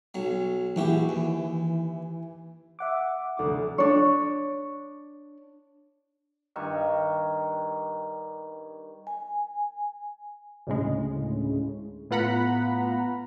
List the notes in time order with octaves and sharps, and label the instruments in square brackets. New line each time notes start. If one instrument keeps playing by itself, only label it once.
[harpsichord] B1 F#3
[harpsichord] A#1 F#4 G4 [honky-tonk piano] E3 E4
[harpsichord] D#2
[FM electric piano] E5 F#5 D6
[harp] F1 D2 D6
[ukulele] D4 C#5
[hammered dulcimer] G2 D#3 C#6
[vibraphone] G#5
[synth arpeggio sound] D2 A2 C#3 G#3
A2 B3 F4 F#5 A#5 B5